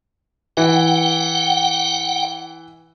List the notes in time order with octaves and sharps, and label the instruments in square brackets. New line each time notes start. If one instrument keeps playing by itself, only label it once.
[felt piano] E3 [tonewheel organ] F#5 G5